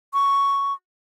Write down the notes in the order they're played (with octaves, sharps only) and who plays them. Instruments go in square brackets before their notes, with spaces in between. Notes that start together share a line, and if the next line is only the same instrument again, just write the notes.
[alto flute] C#6